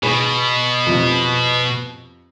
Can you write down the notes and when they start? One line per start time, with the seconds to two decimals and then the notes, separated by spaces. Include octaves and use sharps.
0.03 B2 G#4 B5
0.87 F2 C3